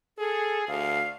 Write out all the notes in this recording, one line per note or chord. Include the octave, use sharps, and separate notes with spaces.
G#4 A4
D2 F5